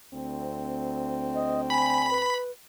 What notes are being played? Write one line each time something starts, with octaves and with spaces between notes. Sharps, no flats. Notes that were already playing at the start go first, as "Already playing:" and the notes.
D2 C4
D#5
G#5 B5
B4